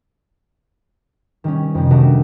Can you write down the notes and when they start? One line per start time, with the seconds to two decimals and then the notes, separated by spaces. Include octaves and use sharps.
1.44 D#3 G3 C#4
1.75 F2 C3
1.91 D#3 G3 A3 D4 F#4 A#4